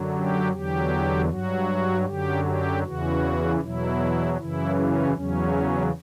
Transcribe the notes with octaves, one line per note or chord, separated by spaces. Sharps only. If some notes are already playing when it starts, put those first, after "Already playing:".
Already playing: F#2 D3 F#3
G4
E2 D3 F#3 G4
G2 F#3 F#4
F#2 D3 F#3 G4
G4
E2 C#3 E3 F#4
E2 B2 F#3 E4
F#2 C#3 E3 E4
C#4
E2 C#3 F#3 C#4